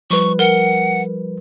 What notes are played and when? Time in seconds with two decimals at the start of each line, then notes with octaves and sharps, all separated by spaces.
0.11 F3 G3 B4 C#6
0.39 A#4 F#5 G7